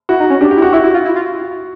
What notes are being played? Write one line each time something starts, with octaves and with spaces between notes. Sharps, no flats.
E4 F#4
D#4
C#4
D4 G4
G4
E4
F#4
E4 F#4
E4
F4
E4
F4